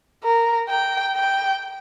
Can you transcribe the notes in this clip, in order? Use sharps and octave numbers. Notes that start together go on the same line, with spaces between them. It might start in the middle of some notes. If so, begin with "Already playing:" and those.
A#4
G5
G5